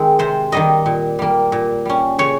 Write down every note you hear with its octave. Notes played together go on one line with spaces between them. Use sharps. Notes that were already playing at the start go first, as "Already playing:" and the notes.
Already playing: D#3 G#3 C4 G#4
C3 C5
D#3 G3 A#3 D#5
A#2
G3 A#3
A#2
G3 C#4
C#3 C#5